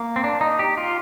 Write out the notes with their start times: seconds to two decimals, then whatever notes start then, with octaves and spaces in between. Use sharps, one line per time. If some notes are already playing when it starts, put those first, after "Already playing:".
Already playing: A#3
0.16 C4
0.24 D4
0.41 D#4
0.59 G4
0.77 F4